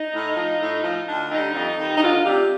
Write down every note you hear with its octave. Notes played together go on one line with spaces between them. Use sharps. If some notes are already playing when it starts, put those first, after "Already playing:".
Already playing: D#4
A2
F3
A2
F3
D2 D4
D3 G3 D#4
F2
D#3 G3
D#4
D2 F4
C3 G3 G4